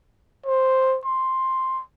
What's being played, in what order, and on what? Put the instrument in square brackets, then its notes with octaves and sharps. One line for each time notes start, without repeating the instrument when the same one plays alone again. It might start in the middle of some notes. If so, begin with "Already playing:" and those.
[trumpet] C5
C6